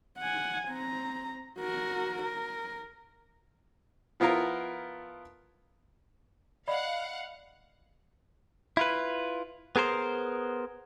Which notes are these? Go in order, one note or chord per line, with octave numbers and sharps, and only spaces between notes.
F#5 G#5
C4 A#5
F#4 A#4
A#4
F3 B3 E4 F4 A#4
D5 D#5 F5 F#5 B5
E4 F4 B4
B3 G#4 A#4 C5